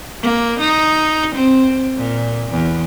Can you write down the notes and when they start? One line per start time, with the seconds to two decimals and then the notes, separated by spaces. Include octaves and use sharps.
0.22 A#3
0.60 D#4
1.35 C4
1.97 A#2
2.50 E2